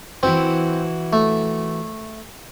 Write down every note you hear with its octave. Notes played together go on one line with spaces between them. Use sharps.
E3 C4 E4 F#4
A3